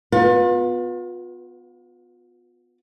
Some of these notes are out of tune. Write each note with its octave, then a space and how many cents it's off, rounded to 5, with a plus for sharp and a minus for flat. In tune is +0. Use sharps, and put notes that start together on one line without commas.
B3 +10 F4 +40 B4 -20